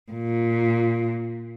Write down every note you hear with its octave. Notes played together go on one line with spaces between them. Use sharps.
A#2